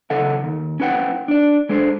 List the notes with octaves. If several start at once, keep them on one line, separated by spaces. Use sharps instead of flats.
B1 C#3 A4 D#5 E5 F#5
D#2
C#4 E4 B4 F#5 G5
D4 D5
G#3 D4 A4 C5